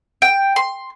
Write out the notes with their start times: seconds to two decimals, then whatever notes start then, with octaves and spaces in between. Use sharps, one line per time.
0.22 G5
0.56 C6